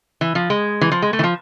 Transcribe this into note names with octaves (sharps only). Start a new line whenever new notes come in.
E3
F3
G#3
E3
F3
G#3
A3
E3
F3